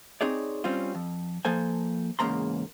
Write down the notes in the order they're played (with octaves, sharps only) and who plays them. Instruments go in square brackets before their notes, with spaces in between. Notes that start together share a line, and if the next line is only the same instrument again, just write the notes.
[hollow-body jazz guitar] C4 D#4 G#4 C#5 D5
G3 C4 C#4 F4
F2
F3 A#3 A4 C5 G#5
E2 G#2 C#3 A#3 A#5 C6